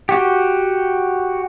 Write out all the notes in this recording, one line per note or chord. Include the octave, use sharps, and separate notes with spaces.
F#4 G4